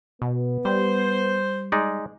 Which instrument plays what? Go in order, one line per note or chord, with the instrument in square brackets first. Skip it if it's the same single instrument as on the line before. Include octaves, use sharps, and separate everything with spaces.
[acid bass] B2 [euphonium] B3
[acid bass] G3 [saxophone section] C5
[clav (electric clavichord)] G#3 D#4 D5